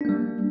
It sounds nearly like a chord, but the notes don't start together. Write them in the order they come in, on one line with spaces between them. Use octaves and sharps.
D4 A#3 G3